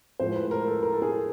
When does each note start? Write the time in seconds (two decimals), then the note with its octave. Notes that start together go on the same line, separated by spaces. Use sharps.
0.19 A2 F3 G#3 C5
0.35 B4
0.51 A#4
0.67 A4
0.83 A#4
0.93 A4
1.02 G#4
1.11 A4